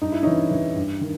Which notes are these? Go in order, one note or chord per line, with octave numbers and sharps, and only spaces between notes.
G2 D#4
E4
E3 C#4 D#4
E3
G2
D#3